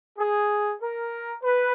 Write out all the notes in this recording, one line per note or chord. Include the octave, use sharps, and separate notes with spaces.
G#4
A#4
B4